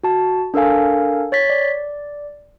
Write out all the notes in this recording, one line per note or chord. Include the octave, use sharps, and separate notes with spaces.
F#4 A5
D4 A4 A#4 F5 G#5
C#5 A6 B6
D5